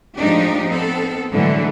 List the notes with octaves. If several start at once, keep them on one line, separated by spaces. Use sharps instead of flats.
A2 F3 G#3 D4 D#4 G4
B3 C4 A4
A2 D3 E3 F#3 G#3